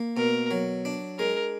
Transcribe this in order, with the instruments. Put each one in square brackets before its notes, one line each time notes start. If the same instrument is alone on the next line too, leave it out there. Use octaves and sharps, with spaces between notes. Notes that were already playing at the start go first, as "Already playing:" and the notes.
Already playing: [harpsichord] A#3
[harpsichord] B2 [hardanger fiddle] A#4
[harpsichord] F#3
D4
[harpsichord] G#3 [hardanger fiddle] A#4